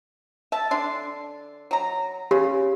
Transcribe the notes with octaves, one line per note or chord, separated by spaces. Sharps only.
E5 A5
D3 D4 C6
F#3 A#5
C#3 G4